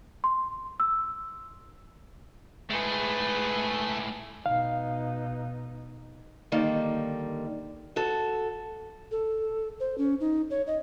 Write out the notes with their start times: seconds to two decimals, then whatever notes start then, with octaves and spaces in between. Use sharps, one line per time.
0.24 C6
0.80 E6
2.70 A2 G#3 A3 G#4 B4
4.46 B2 D#4 F5
6.52 D3 D#3 G3 A#3
7.96 F#4 A4
9.11 A4
9.80 C5
9.98 C#4
10.20 D#4
10.50 C#5
10.67 D#5